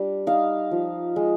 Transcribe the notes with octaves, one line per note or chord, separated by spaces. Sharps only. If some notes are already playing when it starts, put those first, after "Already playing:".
Already playing: G3 D4
D#4 F5
F3
G#3